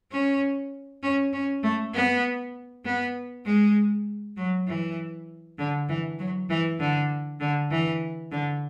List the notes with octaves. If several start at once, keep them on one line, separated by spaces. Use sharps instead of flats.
C#4
C#4
C#4
A3
B3
B3
G#3
F#3
E3
D3
E3
F#3
E3
D3
D3
E3
D3